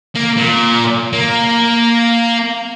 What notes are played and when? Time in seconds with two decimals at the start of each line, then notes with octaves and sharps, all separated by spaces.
0.16 A#3
0.37 A#2
1.13 A#3